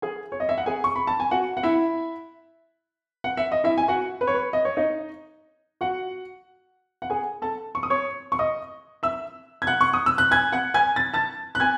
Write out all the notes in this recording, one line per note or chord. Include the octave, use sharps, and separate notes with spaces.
G#4 G#5
C#5
D#5
E5
F#5
G#4 G#5
C#6
B5
A5
G#5
F#4 F#5
F#5
E4 E5
F#5
E5
D#5
E4 E5
G#5
F#4 F#5
B4
C#5
B4
D#5
C#5
D#4 D#5
F#4 F#5
F#5
G#4 G#5
A4 A5
C#6
D#6
C#5 C#6
C#6
D#5 D#6
E5 E6
G#6
F#5 F#6
C#6
D#6
E6
F#6
G#5 G#6
F#5 F#6
G#5 G#6
A6
A5 A6
F#6
G#5 G#6